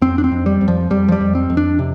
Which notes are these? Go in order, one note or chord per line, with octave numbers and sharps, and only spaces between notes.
F2 C4
D4
C4
F2
G3
F2
F3
F2 G3
F3
G3
F2
C4
F2
D4
C3